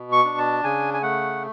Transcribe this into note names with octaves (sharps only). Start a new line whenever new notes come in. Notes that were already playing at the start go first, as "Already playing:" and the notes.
Already playing: B2
C#6
D4
A5
C#3 G#5
G#5
A3 F#5